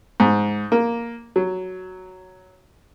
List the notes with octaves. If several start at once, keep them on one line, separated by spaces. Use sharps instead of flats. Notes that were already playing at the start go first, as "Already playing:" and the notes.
G#2
A#3
F#3